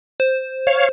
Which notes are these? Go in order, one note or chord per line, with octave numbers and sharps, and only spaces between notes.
C5
C#5 F5